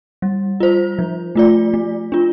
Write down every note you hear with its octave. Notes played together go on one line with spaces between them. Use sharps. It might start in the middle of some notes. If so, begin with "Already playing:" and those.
G3
F4 C5
F3
A3 F4 D5
A3
D4 F4